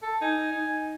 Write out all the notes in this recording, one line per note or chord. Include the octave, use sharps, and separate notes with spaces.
A4
D#4 G#5
D#4